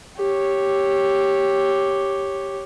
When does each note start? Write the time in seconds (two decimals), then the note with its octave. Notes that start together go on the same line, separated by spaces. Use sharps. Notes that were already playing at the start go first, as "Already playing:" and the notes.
0.17 G4 C#5